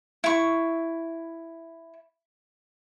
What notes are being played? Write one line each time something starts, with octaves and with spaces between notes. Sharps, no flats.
E4 C#6